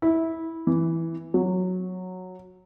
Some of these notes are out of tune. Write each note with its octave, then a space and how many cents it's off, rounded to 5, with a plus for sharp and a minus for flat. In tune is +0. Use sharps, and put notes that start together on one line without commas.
E4 -15
E3 +0
F#3 -10